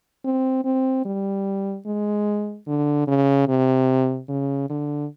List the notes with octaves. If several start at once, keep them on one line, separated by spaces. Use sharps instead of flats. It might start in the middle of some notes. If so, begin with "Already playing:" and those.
C4
C4
G3
G#3
D3
C#3
C3
C#3
D3